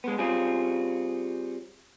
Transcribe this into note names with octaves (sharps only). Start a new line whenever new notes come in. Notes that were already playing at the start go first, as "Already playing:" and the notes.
G#3 B3
G3 C4 C#4 F4 G#4